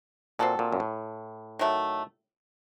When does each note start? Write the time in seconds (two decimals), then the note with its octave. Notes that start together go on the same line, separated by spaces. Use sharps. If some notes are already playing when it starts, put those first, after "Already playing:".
0.39 A#2 C4 F#4 A4
0.59 A#2
0.72 F#2
0.80 A2
1.59 D#3 F#3 A3